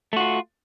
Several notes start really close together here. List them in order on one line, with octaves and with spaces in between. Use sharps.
A3 F#4 F4